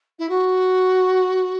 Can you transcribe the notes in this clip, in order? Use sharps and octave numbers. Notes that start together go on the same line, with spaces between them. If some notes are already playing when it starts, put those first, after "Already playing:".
E4
F#4